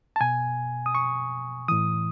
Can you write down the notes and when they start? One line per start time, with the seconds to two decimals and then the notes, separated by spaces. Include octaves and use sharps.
0.16 A5
0.21 B2 G#5
0.86 D#6
0.95 C#6
1.68 A2 E3 D#6